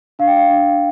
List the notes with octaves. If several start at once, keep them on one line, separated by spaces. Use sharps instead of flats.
D4 F5
G5
F5
D4